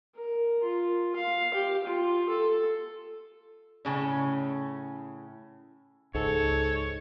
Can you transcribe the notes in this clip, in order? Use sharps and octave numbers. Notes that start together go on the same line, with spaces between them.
A#4
F4
F5
G4
F4
A4
A2 C#3 C#4
C#2 G#2 A4 C#5